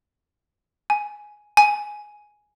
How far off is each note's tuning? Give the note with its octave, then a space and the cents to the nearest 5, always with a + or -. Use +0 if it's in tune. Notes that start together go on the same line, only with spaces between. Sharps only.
G#5 +5
G#5 +5